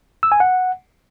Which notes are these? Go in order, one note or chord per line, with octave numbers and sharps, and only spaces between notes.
E6
G#5
F#5